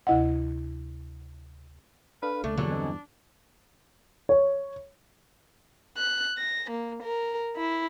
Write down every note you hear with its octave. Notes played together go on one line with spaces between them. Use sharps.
D2 C3 E4 D#5 F#5
D4 A4 B4 F5
C#2 A3 D4
E2 G2 D3 F3 F#3 A#3 G#4
C4 D#5 G#5
C#5
F#6
A#6
A#3
A#4
E4